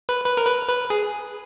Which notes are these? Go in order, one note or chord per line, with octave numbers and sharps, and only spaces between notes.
B4
B4
A#4
B4
B4
G#4